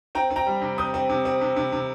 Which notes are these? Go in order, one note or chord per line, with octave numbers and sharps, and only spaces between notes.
C4 G5 A#5
C4
G5 A#5
G3
C3
C4 D#6 G6
C4
C3
C4
C3
C3
C3